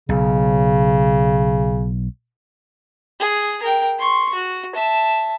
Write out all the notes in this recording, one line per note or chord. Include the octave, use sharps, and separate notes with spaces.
B1 C#3
G#4
A#4 G5
C6 C#6
F#4
E5 A5